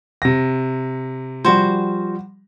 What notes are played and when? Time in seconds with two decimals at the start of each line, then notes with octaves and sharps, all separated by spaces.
0.22 C3 A#6
1.45 F3 G3 F#4 C5